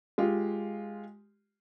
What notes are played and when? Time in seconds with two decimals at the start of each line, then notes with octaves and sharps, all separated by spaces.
0.18 G#3 F4 G4